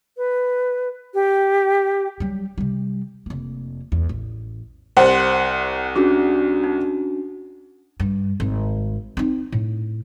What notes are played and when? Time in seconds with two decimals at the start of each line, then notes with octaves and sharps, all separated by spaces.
0.17 B4
1.14 G4
2.20 F#3 G3
2.58 C3 G3
3.26 F1 A#3
3.92 E2
4.09 A1
4.97 C2 C5 F#5 C6
5.96 C#4 D4 F#4 G#4
6.64 D#4
8.00 G2
8.40 G#1
9.17 C4 D#4
9.52 A2